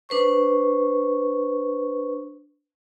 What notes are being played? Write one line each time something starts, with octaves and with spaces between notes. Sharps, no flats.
D4 B4 C5 C#6